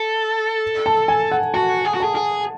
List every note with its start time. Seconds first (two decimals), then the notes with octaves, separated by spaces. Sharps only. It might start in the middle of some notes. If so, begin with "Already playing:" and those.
Already playing: A4
0.86 A5
1.08 G#5
1.31 F#5
1.54 F#4 A5
1.85 G#4
1.94 F#4
2.00 G#4 A5
2.15 G#4